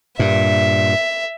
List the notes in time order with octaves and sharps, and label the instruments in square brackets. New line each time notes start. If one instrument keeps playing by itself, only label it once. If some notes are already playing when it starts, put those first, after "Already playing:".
[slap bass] G2 A#2 [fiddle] E5